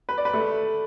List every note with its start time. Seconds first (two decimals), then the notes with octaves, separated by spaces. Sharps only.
0.09 B4
0.18 D5
0.25 B4
0.34 A3